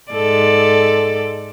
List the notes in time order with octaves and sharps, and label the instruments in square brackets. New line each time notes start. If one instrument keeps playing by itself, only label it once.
[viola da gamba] G#2 A4 D5